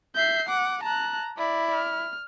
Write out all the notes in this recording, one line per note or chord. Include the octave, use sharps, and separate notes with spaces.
E5 G6 C7
F#5 D6
A5 A#5 F#6
E4 D5
F6